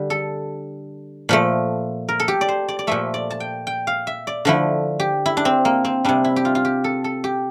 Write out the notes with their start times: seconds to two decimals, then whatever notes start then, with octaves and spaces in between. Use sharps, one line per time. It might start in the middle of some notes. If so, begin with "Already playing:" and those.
Already playing: D3 G3 G4
0.10 A4
1.29 A#2 F3 A3
2.09 A#4
2.20 A4
2.28 G4
2.41 D5
2.49 C5
2.69 D5
2.79 D5
2.87 A#2 F3 A3 E5
3.14 D5
3.31 A5
3.40 G5
3.67 G5
3.87 F5
4.07 E5
4.27 D5
4.45 D3 F3 A3 E4
5.00 G4
5.26 E4
5.37 D4
5.45 C4
5.65 A#3
5.85 C4
6.05 C3 G3 D4
6.25 E4
6.36 G4
6.45 F4
6.55 F4
6.65 G4
6.84 A4
7.04 A4
7.24 G4